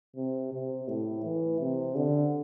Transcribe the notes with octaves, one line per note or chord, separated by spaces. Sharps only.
C3
C3
A2
E3
C3
D3